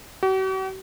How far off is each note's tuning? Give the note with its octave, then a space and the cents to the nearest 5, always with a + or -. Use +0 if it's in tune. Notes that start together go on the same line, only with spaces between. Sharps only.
F#4 +45